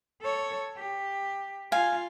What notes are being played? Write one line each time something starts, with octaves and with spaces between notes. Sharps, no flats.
A4 C#5
G4
F4 F5 G#5